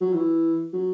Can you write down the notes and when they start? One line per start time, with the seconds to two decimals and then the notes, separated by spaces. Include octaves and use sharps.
0.01 F#3
0.13 E3
0.73 F#3